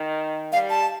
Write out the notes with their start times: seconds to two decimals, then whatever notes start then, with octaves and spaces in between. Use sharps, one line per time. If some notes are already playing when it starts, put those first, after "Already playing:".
Already playing: D#3
0.52 G3 F5
0.70 A5